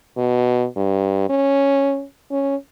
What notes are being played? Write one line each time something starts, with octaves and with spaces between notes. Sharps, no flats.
B2
G2
C#4
C#4